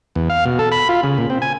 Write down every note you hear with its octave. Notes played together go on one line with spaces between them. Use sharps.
E2
F5
B2
A4
B5
F4
C#3
A#2
C4
G#5